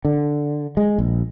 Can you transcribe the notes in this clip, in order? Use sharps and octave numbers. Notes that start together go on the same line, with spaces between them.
D3
G#3
A#1